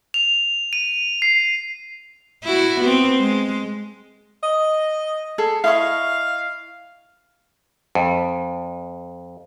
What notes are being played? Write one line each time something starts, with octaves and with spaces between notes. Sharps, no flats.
F7
D#7
C7
E4 F#4
B3 C4
G#3
D#5
G#4 A4
E4 D#5 F5 C#6
F2